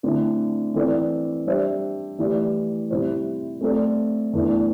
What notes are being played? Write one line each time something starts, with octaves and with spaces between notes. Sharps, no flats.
D3 A3 C4 E4
E3 C4 A4 D5
G3 D4 C5 E5
E3 A3 E4 G4 D5
C3 G3 E4 C5
A3 C4 A4 D5
E2 E3 A3 D4